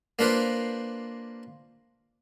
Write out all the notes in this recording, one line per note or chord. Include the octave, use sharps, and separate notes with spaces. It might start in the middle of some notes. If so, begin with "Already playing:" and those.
A#3 D4 F4 B4 C5